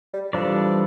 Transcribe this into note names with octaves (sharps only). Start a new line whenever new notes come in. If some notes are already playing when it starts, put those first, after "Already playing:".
G3
E3 F3 G3 D4 A4 D5